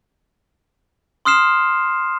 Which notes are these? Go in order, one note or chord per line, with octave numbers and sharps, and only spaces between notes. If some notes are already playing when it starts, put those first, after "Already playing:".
C6 D#6 F6 C7 E7